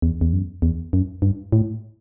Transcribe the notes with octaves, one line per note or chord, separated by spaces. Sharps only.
E2
E2
F#2
E2
F#2
G2
A2